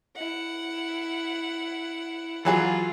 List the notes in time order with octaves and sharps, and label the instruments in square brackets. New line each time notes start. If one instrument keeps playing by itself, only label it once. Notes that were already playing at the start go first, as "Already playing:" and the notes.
[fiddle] E4 F#5
[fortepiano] E3 F#3 G#4 [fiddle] F4